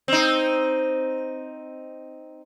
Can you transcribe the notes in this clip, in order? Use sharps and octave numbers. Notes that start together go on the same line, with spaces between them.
C4 D#4